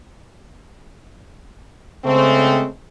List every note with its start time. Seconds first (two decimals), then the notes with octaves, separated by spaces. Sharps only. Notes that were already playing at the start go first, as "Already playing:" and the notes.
2.04 C#3 G#3 A3 C4